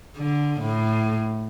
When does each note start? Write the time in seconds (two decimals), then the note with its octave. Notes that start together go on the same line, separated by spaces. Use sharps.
0.17 D3
0.60 A2